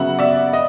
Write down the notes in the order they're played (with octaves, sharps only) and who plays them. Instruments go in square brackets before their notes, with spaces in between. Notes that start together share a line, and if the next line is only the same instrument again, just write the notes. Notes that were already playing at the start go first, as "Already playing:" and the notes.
Already playing: [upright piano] C#3 F#3 B3 E5 F#5
D5 E5
D#5